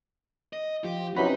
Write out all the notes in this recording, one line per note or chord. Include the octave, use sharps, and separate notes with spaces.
D#5
F3 G4
C3 E3 F#3 C4 C#4 D#4 F#4 B5